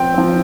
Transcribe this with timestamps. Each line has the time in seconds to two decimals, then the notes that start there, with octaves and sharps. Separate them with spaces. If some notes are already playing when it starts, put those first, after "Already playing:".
Already playing: F3 C4 G5
0.14 F3 C4